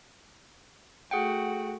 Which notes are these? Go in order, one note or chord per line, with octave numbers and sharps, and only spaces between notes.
A3 F#4 G#4 F#5 G5